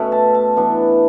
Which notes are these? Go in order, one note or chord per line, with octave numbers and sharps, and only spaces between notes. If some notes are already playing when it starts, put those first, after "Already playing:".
Already playing: B2 A3 C#4 E5
A5
A5
E3 B3 D4